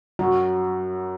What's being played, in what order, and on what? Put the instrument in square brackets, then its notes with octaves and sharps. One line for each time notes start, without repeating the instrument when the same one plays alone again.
[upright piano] F#2 [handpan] F#4